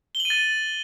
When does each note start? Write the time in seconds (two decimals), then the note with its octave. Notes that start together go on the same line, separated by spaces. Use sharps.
0.15 G7
0.20 F#7
0.25 D#7
0.30 A6